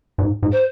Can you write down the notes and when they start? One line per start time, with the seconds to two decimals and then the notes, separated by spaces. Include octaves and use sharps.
0.18 G2
0.23 G#2
0.43 G#2
0.52 C5